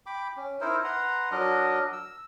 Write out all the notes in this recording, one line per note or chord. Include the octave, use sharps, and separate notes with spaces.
G5 B5 D6
C#4
D#4 E4 A#4 C5
B4 F#5 A#5 C6
F#3 D4 A#4 D#5
E6